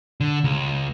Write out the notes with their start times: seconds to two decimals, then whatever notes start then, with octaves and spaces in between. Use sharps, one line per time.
0.21 D3
0.44 C#2